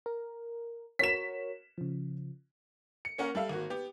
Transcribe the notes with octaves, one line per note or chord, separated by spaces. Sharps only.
A#4
F#4 A#4 C#5 B6 E7
C#3 F3
C#7
A#3 C#4 A#4 F#5
G3 A4 E5 F5
G#1 A#3 F#4
B3 G4